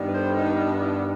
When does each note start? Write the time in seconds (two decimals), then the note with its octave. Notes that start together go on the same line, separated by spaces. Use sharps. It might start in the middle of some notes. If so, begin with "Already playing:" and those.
Already playing: G2 D#3 G3 B3
0.08 B4
0.14 A4 C5
0.36 D#4
0.82 E4